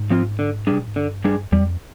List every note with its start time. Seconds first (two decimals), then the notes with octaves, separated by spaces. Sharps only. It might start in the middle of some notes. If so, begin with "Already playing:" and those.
Already playing: G#2
0.10 F3 C4 F4
0.39 D3
0.67 C3 G3 D4 G#4
0.80 A#2
0.88 G#2
0.96 G2 D3
1.24 G3 D4 G#4
1.52 F2 G3